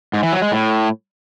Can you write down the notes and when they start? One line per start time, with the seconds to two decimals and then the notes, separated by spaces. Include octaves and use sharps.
0.14 G#2
0.23 E3
0.32 F#3
0.42 G#3
0.51 A2